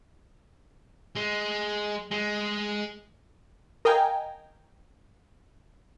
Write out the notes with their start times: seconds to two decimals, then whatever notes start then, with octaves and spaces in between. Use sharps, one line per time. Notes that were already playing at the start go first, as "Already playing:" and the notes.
1.16 G#3
2.11 G#3
3.85 A#4 D#5 F5 G5 G#5 A#5